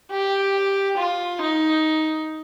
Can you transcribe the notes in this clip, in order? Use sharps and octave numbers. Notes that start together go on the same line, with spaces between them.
G4
F4
D#4